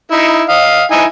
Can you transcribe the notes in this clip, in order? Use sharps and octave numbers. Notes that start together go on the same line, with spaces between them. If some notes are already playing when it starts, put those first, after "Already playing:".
D#4 E4
D#5 F5
D#4 E4 G#5